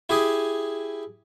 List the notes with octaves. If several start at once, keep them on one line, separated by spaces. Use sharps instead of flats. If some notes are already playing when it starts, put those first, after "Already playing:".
E4 G4 G#4 D#6